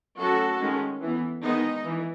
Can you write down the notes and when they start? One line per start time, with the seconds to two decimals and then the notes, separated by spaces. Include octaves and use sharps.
0.19 F#3 A3 C#4 F#4 A4
0.61 D#3 G#3 C#4
1.01 E3 B3
1.44 D#3 G#3 B3 D#4
1.84 E3